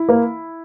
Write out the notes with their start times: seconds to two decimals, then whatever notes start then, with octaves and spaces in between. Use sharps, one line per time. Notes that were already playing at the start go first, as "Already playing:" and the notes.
Already playing: E4
0.09 A#3